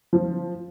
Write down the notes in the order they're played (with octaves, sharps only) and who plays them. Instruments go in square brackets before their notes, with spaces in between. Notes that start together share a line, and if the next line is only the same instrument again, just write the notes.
[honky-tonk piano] F3